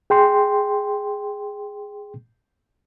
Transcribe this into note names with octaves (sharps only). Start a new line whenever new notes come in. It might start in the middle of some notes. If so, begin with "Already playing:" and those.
G#4 G5 C6